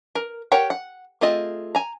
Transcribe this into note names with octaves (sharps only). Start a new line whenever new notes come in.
A#4
G4 A#4 C#5 F#5 G5
F#5
A3 C4 F4 G#4 D#5
G#5 A#5